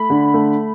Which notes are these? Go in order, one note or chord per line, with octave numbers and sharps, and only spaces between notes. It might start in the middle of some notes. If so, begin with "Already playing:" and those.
Already playing: A3 B5
D3
A3